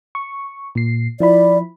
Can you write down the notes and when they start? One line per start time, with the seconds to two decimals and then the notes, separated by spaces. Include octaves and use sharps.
0.15 C#6
0.75 A#2 C7
1.20 F3 E4 D5 B5